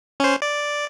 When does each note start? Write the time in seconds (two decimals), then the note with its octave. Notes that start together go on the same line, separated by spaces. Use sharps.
0.20 C#4 C5
0.42 D5